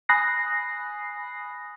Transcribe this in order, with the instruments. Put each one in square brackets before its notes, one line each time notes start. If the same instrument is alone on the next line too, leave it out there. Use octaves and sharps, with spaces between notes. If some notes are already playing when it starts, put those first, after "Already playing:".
[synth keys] G#5 B5 D#6 F#6 A#6 C7